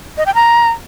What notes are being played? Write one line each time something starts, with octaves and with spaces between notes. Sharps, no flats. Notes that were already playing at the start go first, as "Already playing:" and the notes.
D#5
G5
A#5